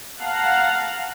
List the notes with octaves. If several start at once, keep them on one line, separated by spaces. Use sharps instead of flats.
F5 F#5 A5 A#5